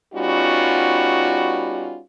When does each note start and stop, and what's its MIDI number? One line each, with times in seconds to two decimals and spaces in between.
0.14 1.99 55
0.14 1.99 59
0.14 1.99 61
0.14 1.99 63
0.14 1.99 65
0.14 1.99 66